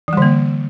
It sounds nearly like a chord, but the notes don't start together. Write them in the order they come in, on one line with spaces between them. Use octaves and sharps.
E3 G3 D3 A#3